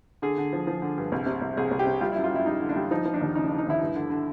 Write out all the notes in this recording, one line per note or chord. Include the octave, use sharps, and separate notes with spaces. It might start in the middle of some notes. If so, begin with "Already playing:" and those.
D3 G#4
D3
F3
F3
D3
G2
C2
C3
C2
C2 G#4
C2
G4
C3
G3 F4
E4
F#2
F4
F#2 E4
G3 D#4
D3
D4
G3
F3 D#4
F3
D4
D#2
C#3 D#4
C#3 D4
D#4
D#2 E4
G2
D3
D3